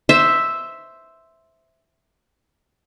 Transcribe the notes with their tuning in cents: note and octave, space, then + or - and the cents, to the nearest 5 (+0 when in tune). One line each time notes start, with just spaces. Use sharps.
C5 +0 E5 +0